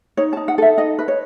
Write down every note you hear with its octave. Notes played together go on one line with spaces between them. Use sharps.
D#4 C#5
A5
D#4
F#5
A4 E5
D#4 D#5
B4
C#5